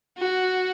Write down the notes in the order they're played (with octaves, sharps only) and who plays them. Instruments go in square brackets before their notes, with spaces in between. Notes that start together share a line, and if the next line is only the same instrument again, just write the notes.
[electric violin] F#4